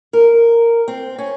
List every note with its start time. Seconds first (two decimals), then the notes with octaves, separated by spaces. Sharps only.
0.13 A#4
0.88 C4
1.18 C#4